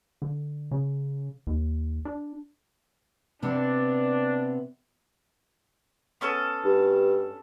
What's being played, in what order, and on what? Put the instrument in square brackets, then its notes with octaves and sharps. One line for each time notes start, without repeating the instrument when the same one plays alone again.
[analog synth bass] D3
C#3
D#2
D4
[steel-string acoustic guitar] C3 B3 C4 [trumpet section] D4
[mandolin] B3 C#4 A4
[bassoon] G2